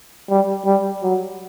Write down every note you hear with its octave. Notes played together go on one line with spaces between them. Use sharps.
G3
G3
F#3